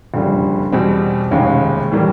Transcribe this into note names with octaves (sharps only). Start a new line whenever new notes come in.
F#1 F2 D3 G3
E2 B2 G3 C4
F1 D#2 D#3 G#3 C#4
A2 E3 G3 A#3